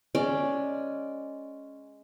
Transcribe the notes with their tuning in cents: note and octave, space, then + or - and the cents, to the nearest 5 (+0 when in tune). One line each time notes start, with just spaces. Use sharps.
G#3 +0 C#4 +0 D5 +0